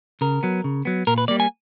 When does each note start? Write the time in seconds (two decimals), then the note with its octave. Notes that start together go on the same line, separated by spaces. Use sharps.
0.21 C#3 A#4
0.43 F#3 B3
0.64 C#3
0.85 F#3 B3
1.07 A#2 A#4
1.18 B4
1.28 G3 A#3 D5
1.40 G#5